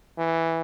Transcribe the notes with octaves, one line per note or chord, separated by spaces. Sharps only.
E3